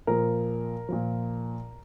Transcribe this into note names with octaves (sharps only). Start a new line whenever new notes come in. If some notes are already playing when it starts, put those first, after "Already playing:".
A#2 F3 A#4
A#2 F3